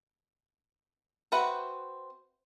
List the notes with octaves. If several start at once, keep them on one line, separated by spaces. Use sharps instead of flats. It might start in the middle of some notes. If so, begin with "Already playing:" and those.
C4 F#4 B4 E5 F#5